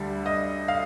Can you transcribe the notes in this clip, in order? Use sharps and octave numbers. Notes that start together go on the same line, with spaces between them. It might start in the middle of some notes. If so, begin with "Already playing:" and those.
Already playing: D2 D3 G3
D#5
F5